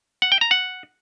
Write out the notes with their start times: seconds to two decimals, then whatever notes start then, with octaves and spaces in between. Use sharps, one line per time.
0.22 F#5
0.32 G5
0.41 A#5
0.51 F#5